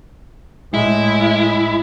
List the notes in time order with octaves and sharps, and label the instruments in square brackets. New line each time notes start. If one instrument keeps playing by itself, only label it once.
[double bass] A2 G#3 [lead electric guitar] E4